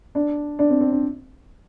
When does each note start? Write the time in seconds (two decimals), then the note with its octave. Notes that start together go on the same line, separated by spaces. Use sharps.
0.15 D4
0.59 D4
0.70 C4
0.81 C4
0.92 D4